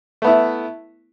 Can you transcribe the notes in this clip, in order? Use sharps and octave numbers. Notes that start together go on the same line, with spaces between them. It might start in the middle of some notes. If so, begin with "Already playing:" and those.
A3 B3 E4